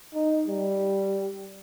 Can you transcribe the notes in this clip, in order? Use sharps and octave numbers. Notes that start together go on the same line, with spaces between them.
D#4
G3